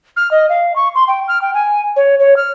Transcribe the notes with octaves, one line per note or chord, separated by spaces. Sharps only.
F6
D#5
F5
C#6
C6
G5
F6
G5
G#5
C#5
C#5
F6